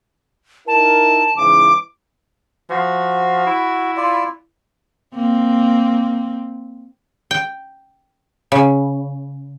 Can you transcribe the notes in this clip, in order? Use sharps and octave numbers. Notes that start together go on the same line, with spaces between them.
D#4 E4 A#4 A5
G#2 C#3 E3 D6
F3 F#4
E4
F4 D5
A#3 C4
G5
C#3